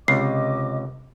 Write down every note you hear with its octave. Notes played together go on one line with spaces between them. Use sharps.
C#2 C3 D#5 D6 C7